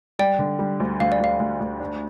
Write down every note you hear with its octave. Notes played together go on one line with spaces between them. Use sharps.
G3 D5 G5
D3
G3
D2
D2 F5
D5
D2 F5
D2
D2
D4